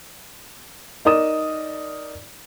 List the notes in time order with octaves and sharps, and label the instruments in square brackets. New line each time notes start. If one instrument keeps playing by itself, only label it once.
[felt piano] D#4 A#4 D5 D#6 E7